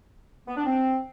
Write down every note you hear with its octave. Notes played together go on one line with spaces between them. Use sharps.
B3
D4
C4